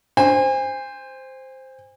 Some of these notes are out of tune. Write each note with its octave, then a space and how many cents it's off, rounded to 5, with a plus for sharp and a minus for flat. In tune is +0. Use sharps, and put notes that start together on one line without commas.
C5 +0 G#5 -35